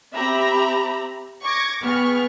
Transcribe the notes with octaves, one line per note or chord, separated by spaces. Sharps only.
C4 G4 E5 A#5 B5
C#6 D6 G#6 A#6
B3 G#4 G5 C#6 F6